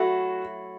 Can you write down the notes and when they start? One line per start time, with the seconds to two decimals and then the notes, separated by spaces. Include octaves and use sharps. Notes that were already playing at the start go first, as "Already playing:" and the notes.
Already playing: F#3 A3 E4 F#4